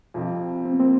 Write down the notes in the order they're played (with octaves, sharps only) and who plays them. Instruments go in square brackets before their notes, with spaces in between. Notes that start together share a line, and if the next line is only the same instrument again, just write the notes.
[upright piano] F2 C3 F3
[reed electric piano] C4
B3
A#3 C4